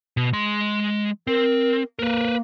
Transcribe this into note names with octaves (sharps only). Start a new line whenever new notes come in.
B2
G#3 C6
C4 A#4
A#3 A#4 B4